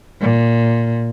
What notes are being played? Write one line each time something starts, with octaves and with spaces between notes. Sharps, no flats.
A#2